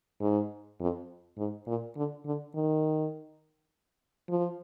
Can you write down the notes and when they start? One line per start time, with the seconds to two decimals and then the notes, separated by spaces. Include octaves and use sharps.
0.21 G#2
0.80 F2
1.37 G#2
1.67 A#2
1.96 D3
2.25 D3
2.55 D#3
4.29 F3